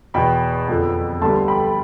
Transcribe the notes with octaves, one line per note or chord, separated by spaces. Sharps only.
E2 B2 B3 G5 B5
F2 D3 F3 B3
D2 D3 G3 B3 A5 C6
G5 B5